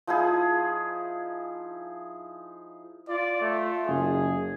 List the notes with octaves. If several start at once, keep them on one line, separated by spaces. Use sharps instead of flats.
F3 D#4 E4 G#4
F4 D5
A3
F#1 G#4